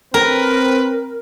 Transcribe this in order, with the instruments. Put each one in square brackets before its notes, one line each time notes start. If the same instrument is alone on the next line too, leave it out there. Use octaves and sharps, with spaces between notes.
[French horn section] C4 [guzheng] A#4 [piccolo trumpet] B4